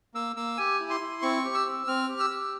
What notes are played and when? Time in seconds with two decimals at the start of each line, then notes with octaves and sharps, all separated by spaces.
0.14 A#3 E6
0.36 A#3 E6
0.58 G4 G#5
0.80 E4
0.90 C6
1.01 E4
1.22 C4 C#6
1.44 G4
1.54 E6
1.66 C4
1.87 C4 F6
2.09 G4
2.20 E6
2.30 G4